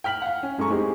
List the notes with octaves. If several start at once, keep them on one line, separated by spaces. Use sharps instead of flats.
G5 F6 B6 F#7
F5 F#5
C#4
F#2 G#3 A4 A#5 C#6
G#3 C4 D#4 E4 G4 G#4